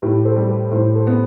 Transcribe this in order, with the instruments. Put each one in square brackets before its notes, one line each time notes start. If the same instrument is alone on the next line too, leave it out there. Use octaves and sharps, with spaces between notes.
[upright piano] A2 [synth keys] G4 B4
[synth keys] A4 C5
[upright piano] G3
[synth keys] G4 B4
[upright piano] A2 [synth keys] A4 C5
[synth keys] A4 C5
[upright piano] B3